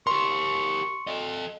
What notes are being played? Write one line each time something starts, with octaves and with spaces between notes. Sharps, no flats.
G4 A#4 C6 C#6
A4 D#5